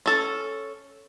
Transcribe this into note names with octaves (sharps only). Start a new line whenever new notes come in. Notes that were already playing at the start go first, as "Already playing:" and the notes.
C#4 A4